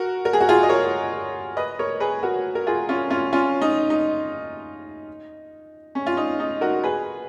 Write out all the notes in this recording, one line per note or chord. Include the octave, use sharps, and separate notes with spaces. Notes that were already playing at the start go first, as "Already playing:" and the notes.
Already playing: F#4 A#4
A#4
G#4
F#4
F4 G#4
D#5
A#4 C#5
B4 D#5
A#4 C#5
G#4 B4
F#4 A#4
A#4
F4 G#4
C#4 F4
C#4 F4
C#4 F4
D#4
D#4
C#4
F4
D#4
D#4
F#4 A#4
G#4 B4